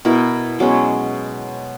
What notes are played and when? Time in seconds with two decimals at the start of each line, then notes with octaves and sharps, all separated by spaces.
0.05 B2 E4 A#4
0.59 B2 F#3 G#3 C#4